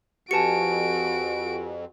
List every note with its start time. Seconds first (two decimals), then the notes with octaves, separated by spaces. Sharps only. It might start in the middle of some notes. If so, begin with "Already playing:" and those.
0.31 F2 F#4 G4 B4 G#5 A5 C#7 D7